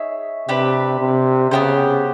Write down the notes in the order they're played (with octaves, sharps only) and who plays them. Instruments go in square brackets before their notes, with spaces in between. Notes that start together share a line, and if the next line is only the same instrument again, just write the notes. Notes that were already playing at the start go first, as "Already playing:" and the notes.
Already playing: [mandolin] D#4 G#4 C#5 E5
[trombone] C3 [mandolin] D4 G4 B4
[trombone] C3
[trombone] C#3 [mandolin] B3 D4 G4 C5